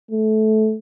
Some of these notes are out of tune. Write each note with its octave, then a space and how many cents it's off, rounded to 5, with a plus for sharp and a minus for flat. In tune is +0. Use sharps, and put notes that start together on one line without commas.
A3 -20